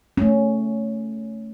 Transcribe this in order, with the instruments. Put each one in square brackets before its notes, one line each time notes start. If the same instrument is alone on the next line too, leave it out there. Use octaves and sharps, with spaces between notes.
[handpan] A3 C#4